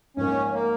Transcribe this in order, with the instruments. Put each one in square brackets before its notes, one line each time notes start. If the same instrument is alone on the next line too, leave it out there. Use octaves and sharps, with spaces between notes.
[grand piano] G#2 F3 A#3 [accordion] C#4
[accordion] A#3